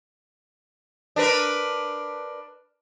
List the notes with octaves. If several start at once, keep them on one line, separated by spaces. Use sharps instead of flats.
D4 A#4 B4